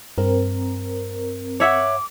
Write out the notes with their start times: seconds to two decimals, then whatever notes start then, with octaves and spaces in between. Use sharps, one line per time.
0.18 G2 C4 A#4
1.60 C#5 E5 F#5 D6